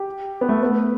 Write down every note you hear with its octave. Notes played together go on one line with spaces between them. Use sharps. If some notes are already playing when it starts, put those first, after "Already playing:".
Already playing: G4
B3
A3
B3